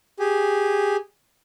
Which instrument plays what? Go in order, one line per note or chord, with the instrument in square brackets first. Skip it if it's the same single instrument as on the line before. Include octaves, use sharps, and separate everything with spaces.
[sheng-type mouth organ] G4 G#4